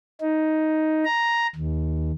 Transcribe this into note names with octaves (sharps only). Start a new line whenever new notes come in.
D#4
A#5
D#2